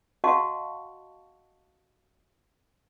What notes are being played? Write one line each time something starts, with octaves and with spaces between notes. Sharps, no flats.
F#4 D#5 F5 F#5 A5 C#6